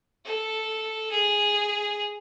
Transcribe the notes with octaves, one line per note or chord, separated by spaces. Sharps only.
A4
G#4